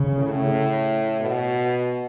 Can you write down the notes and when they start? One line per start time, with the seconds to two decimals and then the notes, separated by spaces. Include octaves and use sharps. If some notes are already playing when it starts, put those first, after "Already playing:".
Already playing: C#3
0.18 A2
1.20 B2